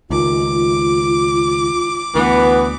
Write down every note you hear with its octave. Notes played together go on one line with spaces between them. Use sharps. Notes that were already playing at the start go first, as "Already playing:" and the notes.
C#2 D#3 F4 D6
D2 E3 B3